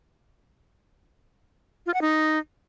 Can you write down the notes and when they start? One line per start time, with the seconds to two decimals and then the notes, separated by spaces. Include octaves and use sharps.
1.86 F4
1.94 F#5
2.01 D#4